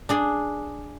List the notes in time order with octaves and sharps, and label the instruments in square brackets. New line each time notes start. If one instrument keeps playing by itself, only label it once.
[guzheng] D4 G#4 D5